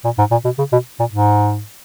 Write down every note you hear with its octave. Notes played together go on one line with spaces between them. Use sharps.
A#2
G#2
A#2
B2
C#3
B2
A#2
G#2